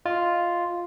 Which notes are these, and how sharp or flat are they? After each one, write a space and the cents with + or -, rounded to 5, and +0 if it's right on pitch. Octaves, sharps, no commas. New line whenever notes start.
F4 +0 D#5 +0